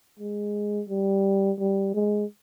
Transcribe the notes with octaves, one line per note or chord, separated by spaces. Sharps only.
G#3
G3
G3
G#3